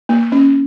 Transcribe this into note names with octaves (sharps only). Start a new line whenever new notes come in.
A#3
C#4